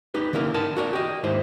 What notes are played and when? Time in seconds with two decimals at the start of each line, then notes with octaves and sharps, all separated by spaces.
0.14 D#4 G4 B4
0.33 D3 A#3 E4 A#4
0.54 D#4 A#4 A5
0.77 F#4 A#4 D5
0.93 G4 D#5
1.24 D#2 G#2 E4 C5